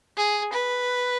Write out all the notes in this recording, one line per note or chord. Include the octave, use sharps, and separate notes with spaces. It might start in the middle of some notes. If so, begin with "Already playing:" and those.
G#4
B4